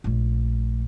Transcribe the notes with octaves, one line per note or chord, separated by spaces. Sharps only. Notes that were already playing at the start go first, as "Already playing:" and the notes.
A#1 A3